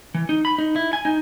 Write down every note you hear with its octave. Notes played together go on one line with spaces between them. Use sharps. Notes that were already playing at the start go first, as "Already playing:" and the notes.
E3
D#4
B5
D#4
E4
G#5
D#4